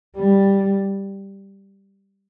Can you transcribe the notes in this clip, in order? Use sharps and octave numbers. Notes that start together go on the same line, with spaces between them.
G3